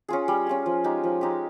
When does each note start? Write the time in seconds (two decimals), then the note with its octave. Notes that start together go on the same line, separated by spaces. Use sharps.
0.08 C#4 F4 G#4
0.28 G3
0.46 C#4 F4 G#4
0.66 F3
0.84 G#3 D#4 G4
1.04 F3
1.21 G#3 D#4 G4